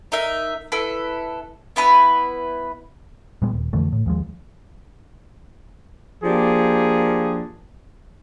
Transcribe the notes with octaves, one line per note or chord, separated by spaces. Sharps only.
D#4 A#4 E5
E4 A4 B4
B3 E4 B4
A#2 G3 G#3 B3
D#1
F2 D3 E3 A3
A2
D#2 F3 G#3
F3 A#3 D4 G4 G#4